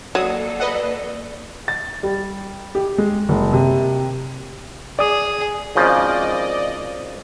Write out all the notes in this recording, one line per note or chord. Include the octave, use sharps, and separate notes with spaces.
F#3 A#3 A4 D5 D#6
B4 D#5 F#5
A6
G3
G4
G#3
F#1
C3
G#4 D5 D#6
G#1 C#3 F3 D5 D#5